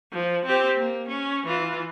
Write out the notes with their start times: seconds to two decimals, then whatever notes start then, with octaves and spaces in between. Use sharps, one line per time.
0.12 F3
0.46 C4 G4
0.78 A#3
1.08 C#4
1.47 E3 F4